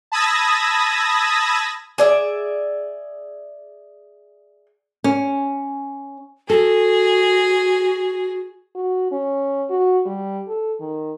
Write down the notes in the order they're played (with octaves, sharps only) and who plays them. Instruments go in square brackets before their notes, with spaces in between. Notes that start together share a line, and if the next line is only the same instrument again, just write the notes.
[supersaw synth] A5 B5 D#6 E6 G#6 A#6
[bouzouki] G#4 D5 E5
[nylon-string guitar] C#4
[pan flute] F#4 [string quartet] G#4 [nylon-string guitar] A4
[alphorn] F#4
C#4
F#4
G3
A4
D#3